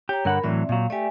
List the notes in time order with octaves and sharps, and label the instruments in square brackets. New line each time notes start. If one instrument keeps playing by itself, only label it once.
[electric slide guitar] G4 [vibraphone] C#5 A#5
[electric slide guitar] G2 D3 F#5 [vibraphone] A#4 B5
[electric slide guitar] A2 E3 F#3 [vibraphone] C4 D5 E5
[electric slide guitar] A#2 F#3 [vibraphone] F5
[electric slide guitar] A3 G4 [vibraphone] D5 E5 G#5